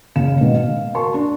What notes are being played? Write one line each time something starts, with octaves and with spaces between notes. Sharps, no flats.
F#1 C#3 F5 E7
G#2 B2 D#3
F5
F#4 A#4 A5 C6 C#6
D4